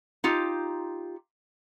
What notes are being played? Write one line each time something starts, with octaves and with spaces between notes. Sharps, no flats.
D#4 F4 G4